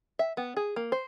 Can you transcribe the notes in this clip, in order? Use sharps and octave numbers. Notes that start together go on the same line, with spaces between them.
E5
B3
G#4
A#3
C5